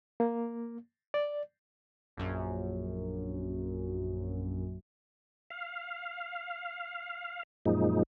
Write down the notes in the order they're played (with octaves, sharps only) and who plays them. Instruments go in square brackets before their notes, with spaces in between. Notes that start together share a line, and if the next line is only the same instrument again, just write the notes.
[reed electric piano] A#3
D5
[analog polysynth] A#1 F#2
[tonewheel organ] F5
F#2 A#2 F3 G#3 D#4